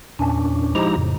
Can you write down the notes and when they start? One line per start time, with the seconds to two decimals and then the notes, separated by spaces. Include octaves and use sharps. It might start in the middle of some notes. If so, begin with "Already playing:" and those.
0.19 E2 A#2 C#4 D4
0.75 F3 G#3 D#4 E4 G4 A#5
0.96 F2 A2 C#3